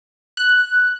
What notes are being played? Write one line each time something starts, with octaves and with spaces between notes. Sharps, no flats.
F#6